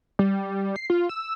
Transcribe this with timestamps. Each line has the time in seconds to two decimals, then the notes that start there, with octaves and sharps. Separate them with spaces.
0.19 G3
0.76 C7
0.90 F4
1.09 E6